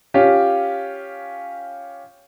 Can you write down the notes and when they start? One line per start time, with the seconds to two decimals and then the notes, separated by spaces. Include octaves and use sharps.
0.14 C#4 F4 G4